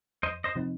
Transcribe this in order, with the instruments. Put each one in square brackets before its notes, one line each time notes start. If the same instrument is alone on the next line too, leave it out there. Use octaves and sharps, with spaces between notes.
[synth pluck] F2 [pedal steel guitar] C5 D#5
[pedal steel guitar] C5 D#5
[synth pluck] C3 F3 C4 D#4